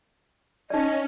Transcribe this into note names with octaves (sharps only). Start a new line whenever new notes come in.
C#4 D#4 D5 D#5